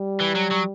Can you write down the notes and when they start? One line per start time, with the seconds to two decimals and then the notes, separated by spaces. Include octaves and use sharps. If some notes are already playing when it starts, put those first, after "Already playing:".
Already playing: G3
0.21 E3
0.36 F#3
0.51 F#3